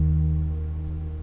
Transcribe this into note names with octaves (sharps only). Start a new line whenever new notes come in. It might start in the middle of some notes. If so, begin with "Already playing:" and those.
Already playing: D#2 D#3